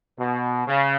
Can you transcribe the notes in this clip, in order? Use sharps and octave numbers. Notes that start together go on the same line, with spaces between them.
B2
C#3